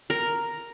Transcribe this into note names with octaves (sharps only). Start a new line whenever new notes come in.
A#4